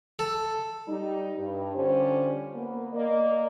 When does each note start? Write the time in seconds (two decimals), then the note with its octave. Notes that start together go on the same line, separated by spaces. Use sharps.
0.19 A4
0.88 G3 D#4
1.38 G2
1.75 D3 G3 C#4 F4 C5
2.55 A#3 B3
2.93 A#3 D5 D#5